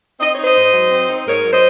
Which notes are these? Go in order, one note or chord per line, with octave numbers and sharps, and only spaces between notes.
C4 D#5
C#5
D#4
C5 D#5
G#2
F#3
C4
D#4
G#2 A#4 C#5
F#3
C5 D#5